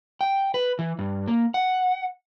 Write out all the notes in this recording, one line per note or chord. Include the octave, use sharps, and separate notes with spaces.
G5
B4
E3
G2
A#3
F#5